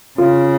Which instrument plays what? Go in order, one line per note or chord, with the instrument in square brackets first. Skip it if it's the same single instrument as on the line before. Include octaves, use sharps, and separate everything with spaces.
[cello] C#3 [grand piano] F4